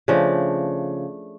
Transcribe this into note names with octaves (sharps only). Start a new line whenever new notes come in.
C#3 F3 A3 D4